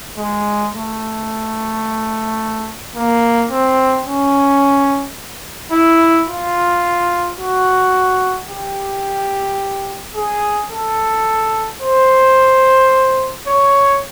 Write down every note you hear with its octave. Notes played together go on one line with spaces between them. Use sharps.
G#3
A3
A#3
C4
C#4
E4
F4
F#4
G4
G#4
A4
C5
C#5